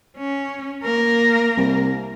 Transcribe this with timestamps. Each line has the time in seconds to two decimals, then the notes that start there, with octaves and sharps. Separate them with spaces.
0.17 C#4
0.83 A#3 A#4
1.57 C2